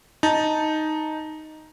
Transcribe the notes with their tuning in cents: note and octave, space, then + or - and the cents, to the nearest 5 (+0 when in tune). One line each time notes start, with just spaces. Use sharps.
D#4 +0 A5 +0